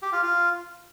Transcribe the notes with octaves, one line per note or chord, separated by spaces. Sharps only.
G4
F4
F4